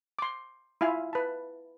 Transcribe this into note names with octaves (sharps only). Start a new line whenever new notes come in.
C6 D6
E4 F4 F5 G#5
B4 A5